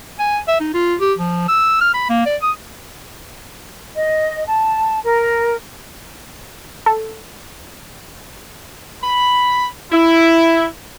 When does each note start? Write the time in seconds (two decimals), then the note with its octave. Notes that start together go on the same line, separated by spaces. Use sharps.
0.19 G#5
0.48 E5
0.60 D#4
0.74 F4
1.00 G4
1.19 F3
1.48 E6
1.81 F6
1.94 B5
2.10 A#3
2.26 D5
2.42 D#6
3.95 D#5
4.46 A5
5.05 A#4
6.86 A4
9.03 B5
9.92 E4